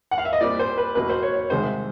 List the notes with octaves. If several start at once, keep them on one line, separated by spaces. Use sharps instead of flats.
F#5
F5
E5
D#5
A#2 G3 C4 D5
C5
B4
E2 B2 F#3 A#3 B4
C5
C#5
C#5
C2 C3 D#3 G#3 C5